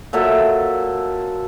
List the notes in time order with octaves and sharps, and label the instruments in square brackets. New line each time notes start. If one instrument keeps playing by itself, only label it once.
[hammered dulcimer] A#2 F#3 A4 E5